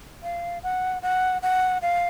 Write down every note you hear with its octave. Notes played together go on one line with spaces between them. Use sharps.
F5
F#5
F#5
F#5
F5